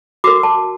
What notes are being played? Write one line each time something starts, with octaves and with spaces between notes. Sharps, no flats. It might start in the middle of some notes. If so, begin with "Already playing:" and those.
F#4 A#4 D6
A5